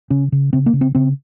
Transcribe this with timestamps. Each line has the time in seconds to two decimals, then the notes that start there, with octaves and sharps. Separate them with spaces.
0.10 C#3 C#4
0.32 C#3
0.53 C#3 C4
0.66 A#3
0.73 C#3
0.81 C4
0.95 C#3 C4